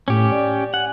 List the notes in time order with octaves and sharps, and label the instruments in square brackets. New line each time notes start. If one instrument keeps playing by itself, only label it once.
[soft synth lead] A2 [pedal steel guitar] C#4 G4
[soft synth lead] D5
[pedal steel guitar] F#5 [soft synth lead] G#5